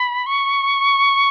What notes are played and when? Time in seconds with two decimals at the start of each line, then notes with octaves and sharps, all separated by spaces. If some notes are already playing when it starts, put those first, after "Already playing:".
Already playing: B5
0.26 C#6